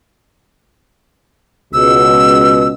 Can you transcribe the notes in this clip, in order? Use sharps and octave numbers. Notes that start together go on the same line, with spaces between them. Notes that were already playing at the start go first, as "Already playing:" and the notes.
C#2 B2 E6